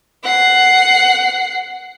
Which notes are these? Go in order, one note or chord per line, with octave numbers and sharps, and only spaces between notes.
F#5 C7